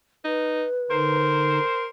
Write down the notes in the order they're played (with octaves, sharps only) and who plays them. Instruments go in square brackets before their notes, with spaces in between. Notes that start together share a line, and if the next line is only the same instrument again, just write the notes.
[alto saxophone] D#4 [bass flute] B4
[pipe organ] D3 D#4 [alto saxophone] A#4 [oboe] C5